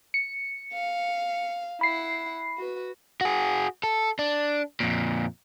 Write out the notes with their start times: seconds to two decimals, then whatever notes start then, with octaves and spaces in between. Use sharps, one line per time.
0.14 C#7
0.73 F5
1.81 E4 F#5 B5 C7
2.58 F#4 B4
3.21 F#4 G#4
3.84 A4
4.19 D4
4.80 F2 A#2